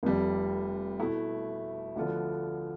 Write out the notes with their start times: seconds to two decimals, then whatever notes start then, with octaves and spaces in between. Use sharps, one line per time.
0.03 F1 F2 C3 G3
0.99 B2 A3 E4
1.96 D2 D3 F3 B3 F4